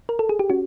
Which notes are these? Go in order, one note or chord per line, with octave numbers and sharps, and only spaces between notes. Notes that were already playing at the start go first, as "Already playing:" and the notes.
A#4
A4
G#4
G4
C#4 F#4